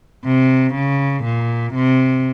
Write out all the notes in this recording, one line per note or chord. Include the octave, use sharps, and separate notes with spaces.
C3
C#3
A#2
C3